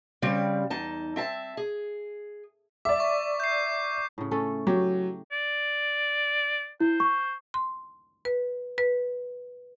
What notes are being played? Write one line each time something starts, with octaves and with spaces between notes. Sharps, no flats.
C#3 G3 C4
E2 D#4 A5
C4 E5 A5
G#4
D5 E5 D6
C#6
G6 C7
A2 C#3
A3 C#4 A4
F#3 G4
D5
E4 C5
C#6
C6
B4
B4